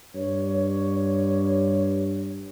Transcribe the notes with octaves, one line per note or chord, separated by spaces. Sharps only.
G2 C#5